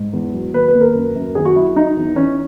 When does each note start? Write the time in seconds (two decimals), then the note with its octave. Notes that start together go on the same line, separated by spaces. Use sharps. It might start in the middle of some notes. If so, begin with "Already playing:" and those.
Already playing: G#2
0.13 E2
0.33 F#3
0.53 D#2 B4
0.68 B4
0.75 D#2
0.81 A#4
0.95 F#2
1.15 F#2
1.35 D#3 G#4
1.45 F#4
1.55 F#3 E4
1.76 F#3 D#4
1.97 E2
2.16 E3 C#4